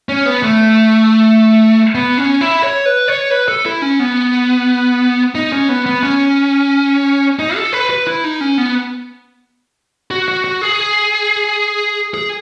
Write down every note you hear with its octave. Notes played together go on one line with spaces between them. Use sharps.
C#4
B3
A3
B3
C#4
E4
C#5
B4
C#5
B4
A4
E4
C#4
B3
D#4
C#4
B3
B3
C#4
D#4
A4
B4
B4
E4
D#4
C#4
B3
F#4
F#4
F#4
G#4
G#4